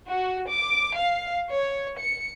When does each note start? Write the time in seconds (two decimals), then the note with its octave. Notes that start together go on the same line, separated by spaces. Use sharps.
0.11 F#4
0.50 D6
0.98 F5
1.51 C#5
1.98 C#7